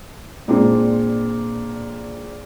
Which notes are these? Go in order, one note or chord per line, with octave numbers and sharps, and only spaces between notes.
A#2 G#3 C4 D4